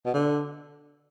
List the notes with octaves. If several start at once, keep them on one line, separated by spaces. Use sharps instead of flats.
B2
D3